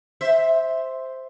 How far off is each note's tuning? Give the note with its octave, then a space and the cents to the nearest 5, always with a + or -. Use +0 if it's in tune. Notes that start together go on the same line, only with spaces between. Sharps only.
C5 +0 E5 -10